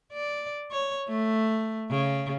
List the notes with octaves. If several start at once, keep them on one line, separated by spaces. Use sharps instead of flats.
D5
C#5
A3
C#3